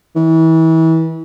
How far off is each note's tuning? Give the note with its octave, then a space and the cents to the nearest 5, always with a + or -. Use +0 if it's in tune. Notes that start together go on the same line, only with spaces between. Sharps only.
E3 -30